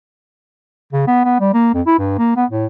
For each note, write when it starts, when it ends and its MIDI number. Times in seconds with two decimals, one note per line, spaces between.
0.92 1.04 49
1.07 1.22 59
1.24 1.40 59
1.40 1.51 55
1.53 1.72 58
1.73 1.81 41
1.86 1.97 64
1.98 2.15 43
2.18 2.31 58
2.36 2.45 59
2.50 2.66 45